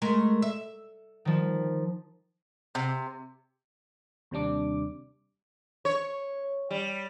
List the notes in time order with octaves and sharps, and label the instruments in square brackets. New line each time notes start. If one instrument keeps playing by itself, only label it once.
[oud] G#3 A3 A#4
E5
[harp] D#3 F3
[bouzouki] C3
[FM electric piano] D#2 C3 G3 D4 D6
[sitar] C#5
G3